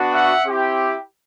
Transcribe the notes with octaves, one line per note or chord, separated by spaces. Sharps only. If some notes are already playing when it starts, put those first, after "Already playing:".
Already playing: B3 D4 F#4
E5 F#5
C4 E4 G4